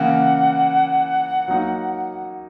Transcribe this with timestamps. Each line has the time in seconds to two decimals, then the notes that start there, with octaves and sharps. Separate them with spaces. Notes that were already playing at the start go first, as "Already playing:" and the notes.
Already playing: C#3 E3 A#3 F#5
1.48 F#3 A#3 D#4